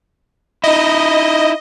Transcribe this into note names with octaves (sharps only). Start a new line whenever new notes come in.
D#4 E4 D#5